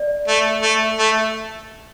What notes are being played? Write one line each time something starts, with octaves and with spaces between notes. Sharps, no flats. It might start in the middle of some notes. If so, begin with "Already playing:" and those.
Already playing: D5
A3
A3
A3